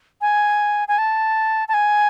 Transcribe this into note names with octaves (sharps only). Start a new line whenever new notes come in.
G#5
G#5
A5
A5
G#5